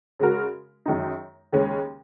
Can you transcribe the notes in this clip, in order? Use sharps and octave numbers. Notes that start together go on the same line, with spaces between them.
C#3 G#3 F#4 A#4
F#2 D#3 G#3 D#4
D#2 C#3 G#3 C#4